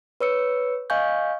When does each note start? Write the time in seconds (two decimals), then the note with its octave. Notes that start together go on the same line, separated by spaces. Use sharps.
0.21 B4 C#5 E6 C#7
0.90 D#5 F5 G#5 C#6 G6